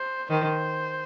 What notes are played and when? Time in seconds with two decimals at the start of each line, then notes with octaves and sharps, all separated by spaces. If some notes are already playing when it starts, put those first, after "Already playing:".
Already playing: C5
0.30 D#3 C5